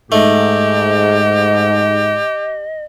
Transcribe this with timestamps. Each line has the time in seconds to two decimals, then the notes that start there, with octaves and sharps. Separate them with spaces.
0.12 G#2 A3 G4 D#5